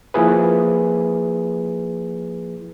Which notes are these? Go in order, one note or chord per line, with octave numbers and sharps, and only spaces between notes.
F3 A#3 E4 G#4 B4